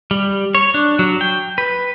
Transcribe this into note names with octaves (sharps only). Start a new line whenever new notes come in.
G3
C#5
D4
F#3
G5
B4